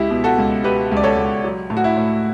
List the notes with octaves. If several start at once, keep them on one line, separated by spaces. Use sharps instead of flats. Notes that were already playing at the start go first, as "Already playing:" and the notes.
Already playing: C#2 E4 G4
B2
F#4 A4
C#2
B2 G4 B4
C#2
D5
A4 C#5
C#2
F#3
A2
F#4
E4
A2